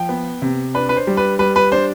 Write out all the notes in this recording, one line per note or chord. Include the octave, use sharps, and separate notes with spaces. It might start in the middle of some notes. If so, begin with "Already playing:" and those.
Already playing: F3 G5
B3
C3
D4 B4
B4
C5
G3
B4
G3 B4
B4
D4 C5